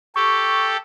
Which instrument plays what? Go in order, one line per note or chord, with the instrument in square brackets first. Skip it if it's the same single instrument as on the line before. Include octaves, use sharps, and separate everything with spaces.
[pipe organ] G4 A4 [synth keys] C#6